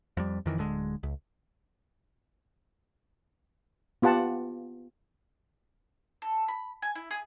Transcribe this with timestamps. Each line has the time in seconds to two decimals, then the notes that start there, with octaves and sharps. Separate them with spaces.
0.17 F2 G3
0.46 F2 D#3 E3
0.58 D1 D3 G#3
1.03 C#2
4.02 B3 F4 G4 F#5 A5
6.22 A4
6.48 B5
6.82 G#5
6.95 E4
7.11 G#4